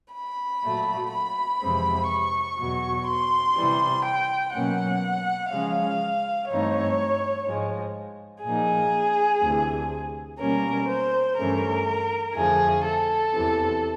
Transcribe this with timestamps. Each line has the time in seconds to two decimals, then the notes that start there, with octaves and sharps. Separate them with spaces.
0.14 B5
0.62 A#2 F#3 A3
1.11 B5
1.61 F2 C3 E3 G#3 C4
2.09 C#6
2.58 E2 B2 F#3
3.07 C6
3.56 C3 E3 G3
4.05 G5
4.53 B2 F#3 A#3 C#4 F#5
5.51 C#3 F3 G#3 C#4 F5
6.49 G2 E3 A3 C4 D#4 C#5
7.46 G#2 F3 G#3
8.45 A#2 F3 A#3 D#4 G#4
9.42 D2 C3 E3
10.39 B2 G3 A#3 C#4 A#4
10.88 C5
11.37 G2 E3 A3 C#4 A#4
12.34 F2 D3 F3 A3 G#4
12.84 A4
13.33 E2 C3 E3